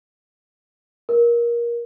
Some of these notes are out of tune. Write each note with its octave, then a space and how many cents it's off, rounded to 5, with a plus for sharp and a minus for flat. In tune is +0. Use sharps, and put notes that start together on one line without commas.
A#4 +20